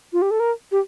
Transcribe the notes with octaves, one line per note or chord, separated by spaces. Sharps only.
F4
G4
A4
A#4
G4